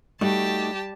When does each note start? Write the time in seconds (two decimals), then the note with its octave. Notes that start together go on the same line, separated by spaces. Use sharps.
0.21 G3 A3 D#4 F#4 G4 A5